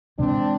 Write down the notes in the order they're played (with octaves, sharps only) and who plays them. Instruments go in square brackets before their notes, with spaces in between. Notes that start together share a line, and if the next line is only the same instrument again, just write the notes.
[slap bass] C3 E3 G#3 [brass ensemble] C4 D4